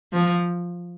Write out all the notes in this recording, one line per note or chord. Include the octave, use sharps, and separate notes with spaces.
F3